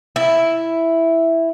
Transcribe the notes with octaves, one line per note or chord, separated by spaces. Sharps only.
E4